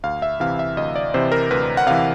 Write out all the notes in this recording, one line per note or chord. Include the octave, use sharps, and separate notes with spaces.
D2 F5
E5
C3 E3 F5
E5
D2 D#5
D5
C3 E3 C5
A#4
D2 B4
F#5
C3 E3 F5